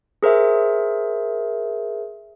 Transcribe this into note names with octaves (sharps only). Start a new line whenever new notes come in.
G#4 A#4 C5 E5